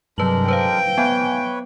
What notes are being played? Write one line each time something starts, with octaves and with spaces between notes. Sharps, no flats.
G2 C3 F#3 G#3 D4 A#4 B4 F#7
B4 C5 F5 G5
B3 B4 C#5 F5 G#5